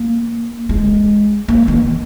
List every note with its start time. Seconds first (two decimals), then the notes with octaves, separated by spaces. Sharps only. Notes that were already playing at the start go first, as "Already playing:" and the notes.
Already playing: A#3
0.69 G#3
1.48 A#3
1.68 D#3